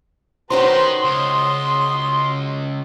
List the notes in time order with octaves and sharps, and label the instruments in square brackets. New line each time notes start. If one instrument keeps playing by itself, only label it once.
[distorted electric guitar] D#3 [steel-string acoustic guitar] C#4 F#4 C5 [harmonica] G4 B4 A#5 [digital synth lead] C6
[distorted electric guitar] C#2 [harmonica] D#6